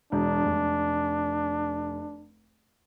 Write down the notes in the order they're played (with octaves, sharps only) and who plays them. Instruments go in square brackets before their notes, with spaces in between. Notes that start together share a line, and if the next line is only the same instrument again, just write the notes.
[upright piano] E1 [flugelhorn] D4
[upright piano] F1